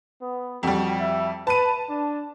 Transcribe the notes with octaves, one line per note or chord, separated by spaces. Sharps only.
B3
F2 G3 F#4
E5
B4 A5 D#7
D4